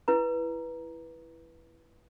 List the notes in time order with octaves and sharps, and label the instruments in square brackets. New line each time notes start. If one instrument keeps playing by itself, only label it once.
[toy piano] E4 B4 A#5